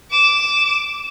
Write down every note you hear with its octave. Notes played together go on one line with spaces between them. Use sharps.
D6 E7